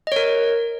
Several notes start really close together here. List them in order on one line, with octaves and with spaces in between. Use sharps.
D#5 C#5 A#4